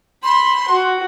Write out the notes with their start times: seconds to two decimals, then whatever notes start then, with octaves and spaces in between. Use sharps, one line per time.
0.23 B5 C6
0.68 F#4